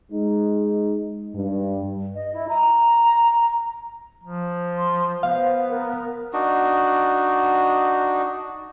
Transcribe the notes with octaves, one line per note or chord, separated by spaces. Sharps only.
G#3 D#4
G2
D#5
E4
A#5
F3
C6
B3 C5 F5
A#4
D4 D#4 F#4